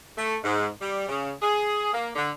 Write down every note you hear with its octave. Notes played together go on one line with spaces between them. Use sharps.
A3
G#2
G3
C#3
G#4
A#3
D3